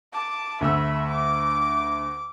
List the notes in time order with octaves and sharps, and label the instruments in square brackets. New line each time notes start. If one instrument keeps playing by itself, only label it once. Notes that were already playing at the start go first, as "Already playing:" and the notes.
[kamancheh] A5 D6
[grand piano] D2 A3 E6 [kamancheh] E5 B5
[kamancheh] D6